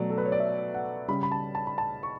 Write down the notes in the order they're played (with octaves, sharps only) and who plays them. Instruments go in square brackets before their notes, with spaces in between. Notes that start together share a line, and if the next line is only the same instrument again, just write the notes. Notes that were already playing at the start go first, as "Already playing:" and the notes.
Already playing: [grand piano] B2 F#3 A3 D5
A4
B4
C#5
D5
E5
F#5
C#3 G3 B5
B5
A5
A5
B5
A5
C#6